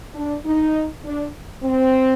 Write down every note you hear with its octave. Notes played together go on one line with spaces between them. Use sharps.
D4
D#4
D4
C4